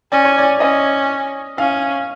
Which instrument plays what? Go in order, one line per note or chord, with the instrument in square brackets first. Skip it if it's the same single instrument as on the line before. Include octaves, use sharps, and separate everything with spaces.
[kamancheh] C#4 [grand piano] D5
[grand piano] C#5
D5
[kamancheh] C#4 [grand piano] D#5
[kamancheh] C#4 [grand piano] F5